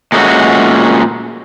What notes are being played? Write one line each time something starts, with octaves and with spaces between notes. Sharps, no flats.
A#2 G#3 A3 B3 C#4 F#4